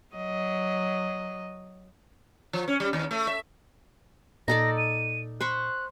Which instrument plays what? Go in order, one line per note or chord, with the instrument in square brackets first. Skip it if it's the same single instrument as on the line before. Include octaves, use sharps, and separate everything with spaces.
[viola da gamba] F#3 D#5
[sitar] F3
C#4
G3
D#2
A3
E5
[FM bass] A#2 [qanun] D#4 A4 D5 [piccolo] A#6
[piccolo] D#7
[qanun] C5 B5 C#6 [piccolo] F#6